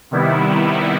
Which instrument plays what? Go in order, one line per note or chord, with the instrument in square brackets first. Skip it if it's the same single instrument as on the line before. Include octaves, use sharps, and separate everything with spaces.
[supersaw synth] C3 D#3 G3 B3 E4